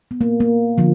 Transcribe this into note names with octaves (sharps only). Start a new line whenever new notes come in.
B3
A#3
A#3
D3 F3